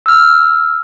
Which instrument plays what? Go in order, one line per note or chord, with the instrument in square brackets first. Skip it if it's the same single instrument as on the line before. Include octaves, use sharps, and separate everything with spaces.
[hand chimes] E6 F6